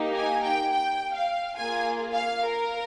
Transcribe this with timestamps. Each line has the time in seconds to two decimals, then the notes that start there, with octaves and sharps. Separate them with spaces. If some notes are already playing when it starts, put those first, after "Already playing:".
Already playing: A#3 D#4 G4
0.14 G#5
0.43 G5
0.72 G5
1.14 F5
1.56 A#3 F4 G#4 G#5
2.14 F5
2.43 A#4